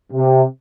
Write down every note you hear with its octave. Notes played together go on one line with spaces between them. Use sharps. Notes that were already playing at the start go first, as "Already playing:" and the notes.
C3